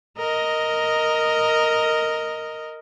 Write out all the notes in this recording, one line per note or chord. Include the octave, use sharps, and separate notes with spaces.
A#4 D#5